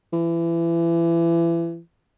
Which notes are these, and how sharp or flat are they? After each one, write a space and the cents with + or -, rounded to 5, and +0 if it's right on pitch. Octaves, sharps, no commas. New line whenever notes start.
E3 +30